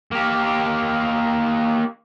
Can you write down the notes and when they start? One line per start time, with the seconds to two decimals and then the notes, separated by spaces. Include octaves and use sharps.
0.11 A#3 G4